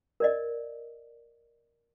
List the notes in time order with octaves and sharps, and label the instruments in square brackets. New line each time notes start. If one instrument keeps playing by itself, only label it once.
[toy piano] A#4 D5 D#5